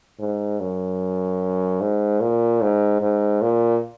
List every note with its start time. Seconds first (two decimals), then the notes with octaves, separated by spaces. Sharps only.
0.19 G#2
0.61 F#2
1.81 G#2
2.20 A#2
2.62 G#2
3.01 G#2
3.42 A#2